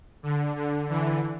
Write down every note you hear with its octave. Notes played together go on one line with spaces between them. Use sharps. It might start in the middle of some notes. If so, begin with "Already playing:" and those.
D3
D3
D3 E3